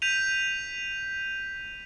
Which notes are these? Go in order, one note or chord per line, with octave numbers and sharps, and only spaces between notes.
G6 B6 D#7 F7